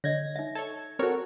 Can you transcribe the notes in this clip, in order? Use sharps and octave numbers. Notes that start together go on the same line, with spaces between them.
D3 C#5 D#5 G#6 A#6
D#4 E5
A4 C#5 G#6
C4 F#4 A4 A#4 C#5